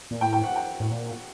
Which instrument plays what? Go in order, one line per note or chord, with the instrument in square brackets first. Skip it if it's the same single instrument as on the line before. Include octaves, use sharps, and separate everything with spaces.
[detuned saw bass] A#2
[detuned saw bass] A2 [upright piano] G5
[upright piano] G5
F#5
G5
[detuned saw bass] A2
A#2